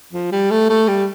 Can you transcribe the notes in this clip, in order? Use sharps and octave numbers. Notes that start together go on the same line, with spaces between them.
F3
G3
A3
A3
G3